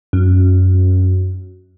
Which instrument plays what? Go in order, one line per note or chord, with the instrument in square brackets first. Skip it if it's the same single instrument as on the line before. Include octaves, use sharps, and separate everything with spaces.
[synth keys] F#2